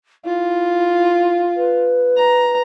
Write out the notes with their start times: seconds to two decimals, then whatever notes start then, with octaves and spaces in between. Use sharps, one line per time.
0.25 E4 F4
1.57 B4
2.17 A#5